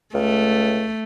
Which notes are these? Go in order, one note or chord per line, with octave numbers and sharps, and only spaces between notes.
C#2 A3